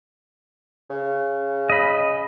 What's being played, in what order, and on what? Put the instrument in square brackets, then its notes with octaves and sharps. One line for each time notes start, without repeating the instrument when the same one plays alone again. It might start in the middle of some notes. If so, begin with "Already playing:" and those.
[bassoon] C#3
[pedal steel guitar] D#5 B5